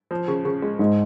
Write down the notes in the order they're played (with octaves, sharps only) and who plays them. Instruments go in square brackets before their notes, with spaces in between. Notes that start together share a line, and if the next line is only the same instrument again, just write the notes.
[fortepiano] F3
C#3
C#3
G#3
[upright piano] G#2 [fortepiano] G#3